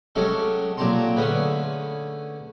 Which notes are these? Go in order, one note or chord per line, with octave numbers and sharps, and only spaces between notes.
F#3 G#3 A3 C#4 G4 A4
A#2 F#3 G4 A5 A#5 C6
D3 A3 C#4 G#4 B4